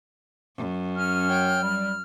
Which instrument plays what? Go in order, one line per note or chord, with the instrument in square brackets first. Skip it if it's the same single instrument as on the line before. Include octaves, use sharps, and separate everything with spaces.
[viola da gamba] F#2
[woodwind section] C#4 [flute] F6
[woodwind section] C#5 G5
G3